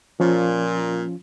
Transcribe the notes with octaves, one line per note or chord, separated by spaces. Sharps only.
A#2 F3 C#4 F4